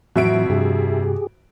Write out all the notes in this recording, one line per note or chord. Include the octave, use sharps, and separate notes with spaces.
F2 A2 E3 F#3 F#4 E5 D7
G2 C3 G4 G#4